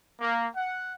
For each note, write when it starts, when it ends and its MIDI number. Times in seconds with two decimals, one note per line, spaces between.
0.20 0.47 58
0.56 0.94 78